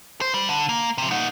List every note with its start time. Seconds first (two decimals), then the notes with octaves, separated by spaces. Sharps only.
0.21 C5
0.34 G3
0.49 D3
0.69 A#3
0.98 C3 F3
1.11 D#4 F#5